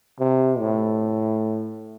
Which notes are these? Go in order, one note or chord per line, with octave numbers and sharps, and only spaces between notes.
C3
A2